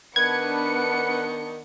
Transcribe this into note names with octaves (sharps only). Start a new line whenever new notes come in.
D#3 B3 D4 B4 F#5 G#6 C#7